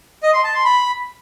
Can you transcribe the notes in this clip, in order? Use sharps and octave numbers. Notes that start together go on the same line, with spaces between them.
D#5
C6
A5
C6
B5